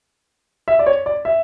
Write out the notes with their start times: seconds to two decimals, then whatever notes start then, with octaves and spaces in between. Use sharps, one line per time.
0.68 E5
0.79 D5
0.86 C#5
1.06 D5
1.25 E5